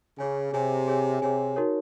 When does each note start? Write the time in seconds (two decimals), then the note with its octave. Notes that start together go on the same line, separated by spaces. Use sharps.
0.18 C#3 G#4 C#5 G#5
0.52 C3 G#4 C#5 G#5
0.88 G#4 C#5 G#5
1.22 C3 G#4 C#5 G#5
1.56 D#4 F#4 A#4 C#5